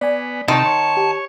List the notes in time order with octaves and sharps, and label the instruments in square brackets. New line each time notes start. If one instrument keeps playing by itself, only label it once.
[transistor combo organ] B3 [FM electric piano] D5 G#5
[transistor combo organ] C3 D#4 [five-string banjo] D#3 [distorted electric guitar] A5 [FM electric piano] C6 C#6
[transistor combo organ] C#5
[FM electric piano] G4